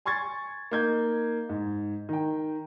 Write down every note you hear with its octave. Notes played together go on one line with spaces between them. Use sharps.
G#5 C6 C#6 G#6 A6
A#3 D#4 G6 G#6
G#2
D#3 G5